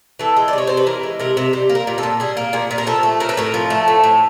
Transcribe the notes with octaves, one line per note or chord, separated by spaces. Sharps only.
E3 A4
G#3
D5
C3 C#5
C3 C5
B4
E3 A#4
G#3
C3 A#4
C3
G3 C5
A#3
A#4
A#2
A4
A#2
G3 G#4
A#3
A#2 G#4
A#2
A#4
F3 A4
A3
A2 A#4
B4
A2 A#4
F3
A3
A2
A2